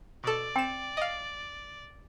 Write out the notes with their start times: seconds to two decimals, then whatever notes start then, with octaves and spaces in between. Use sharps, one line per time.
0.24 B2 A4 D5
0.56 C4 G5 E7
0.97 D#5 F5